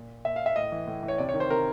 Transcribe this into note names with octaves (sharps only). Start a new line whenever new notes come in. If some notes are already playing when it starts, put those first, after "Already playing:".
Already playing: A#2
A#2 E5
F5
E5
A2 D#5
E3
A2
E3
C#5
C3 D5
C#5
D#3
C5
C3 A#4